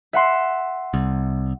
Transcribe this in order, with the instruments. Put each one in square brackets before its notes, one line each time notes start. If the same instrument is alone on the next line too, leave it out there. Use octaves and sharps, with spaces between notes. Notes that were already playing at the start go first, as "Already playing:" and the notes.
[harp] E5 F#5 C6
[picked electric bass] C2